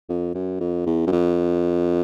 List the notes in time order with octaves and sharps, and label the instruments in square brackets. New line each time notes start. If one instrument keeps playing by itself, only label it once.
[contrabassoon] F2
F#2
F2
E2
F#2
F2